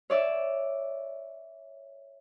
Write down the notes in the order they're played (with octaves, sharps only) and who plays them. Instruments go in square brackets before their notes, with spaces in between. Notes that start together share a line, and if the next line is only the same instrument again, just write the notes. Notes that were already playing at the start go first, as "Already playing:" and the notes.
[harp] C#5 D5 E5